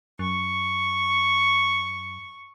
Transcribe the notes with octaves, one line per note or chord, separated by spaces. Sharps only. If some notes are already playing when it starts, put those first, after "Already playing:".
F#2 C#6